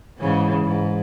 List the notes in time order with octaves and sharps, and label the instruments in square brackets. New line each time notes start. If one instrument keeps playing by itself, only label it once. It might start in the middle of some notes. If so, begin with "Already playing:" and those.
[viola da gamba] G#2 C#3 E3
G#2